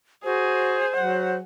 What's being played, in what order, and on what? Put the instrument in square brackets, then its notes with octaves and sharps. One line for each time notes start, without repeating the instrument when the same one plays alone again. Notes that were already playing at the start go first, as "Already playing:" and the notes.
[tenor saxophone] F#4 [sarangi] G#4 [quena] C5
[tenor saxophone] F#3 [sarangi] F#5